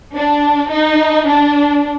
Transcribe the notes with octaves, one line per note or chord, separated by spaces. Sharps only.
D4
D#4
D4